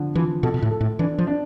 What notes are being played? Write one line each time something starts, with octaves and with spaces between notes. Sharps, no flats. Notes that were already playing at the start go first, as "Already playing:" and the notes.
Already playing: D3 F3
E3 F3
B2 A4
B2
A2
A4
A2
E3 D4
F3
D4